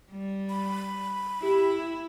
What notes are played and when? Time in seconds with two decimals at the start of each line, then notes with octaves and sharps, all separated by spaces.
0.10 G3
0.49 B5
1.42 E4 G4